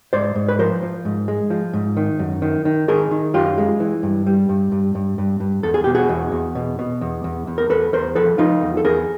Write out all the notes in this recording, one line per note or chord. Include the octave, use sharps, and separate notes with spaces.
G#2 C5 D5
G#2
B4
F3 A#4 C5
F3
G#2
G#3
F3
G#2
D#3
F#2
D#3
D#3
D#3 G#4 A#4
D#3
F#2 F4 G4
G#3
E3
G2
G3
G2
G2
G2
G2
G2
E2 A4
G#4
B2 G4
F#4 G#4
E2
E2
B2
B2
E2
E2
E2
A#4
E2 A4 B4
E2 A#4 C5
F3 A4 B4
F3 D#4 F4
E2
A4
E2 G#4 A#4